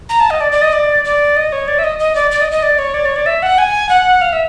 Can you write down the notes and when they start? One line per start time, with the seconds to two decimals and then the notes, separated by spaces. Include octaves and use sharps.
0.09 A#5
0.20 A5
0.30 D#5
0.40 D5
0.52 D5
0.61 D#5
0.72 D5
1.04 D5
1.36 D#5
1.52 C#5
1.68 D5
1.79 E5
1.84 D#5
1.99 D#5
2.15 D5
2.31 D5
2.41 D#5
2.52 D#5
2.62 D5
2.78 C#5
2.94 D5
3.05 C#5
3.16 D5
3.26 E5
3.42 F#5
3.58 G#5
3.89 F#5
4.21 F5
4.32 E5